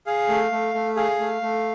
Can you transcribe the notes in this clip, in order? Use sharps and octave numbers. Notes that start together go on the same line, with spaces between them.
G#4 F5
A3
A3
A3
G#4 F5
A3
A3